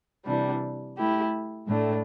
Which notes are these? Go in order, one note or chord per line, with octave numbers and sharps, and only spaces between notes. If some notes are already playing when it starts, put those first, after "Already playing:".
C3 E3 G3 D4
A3 E4 G4
A2 A3 D4